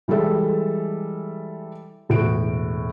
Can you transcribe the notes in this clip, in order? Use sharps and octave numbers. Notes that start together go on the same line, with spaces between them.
E3 G3 G#3 A4 E5
E1 A2 F#4 D7